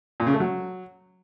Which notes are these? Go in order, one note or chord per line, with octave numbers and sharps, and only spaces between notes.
A#2
C#3
A3
F#3